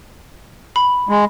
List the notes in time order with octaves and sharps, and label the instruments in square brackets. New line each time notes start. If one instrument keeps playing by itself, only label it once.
[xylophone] B5
[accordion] G#3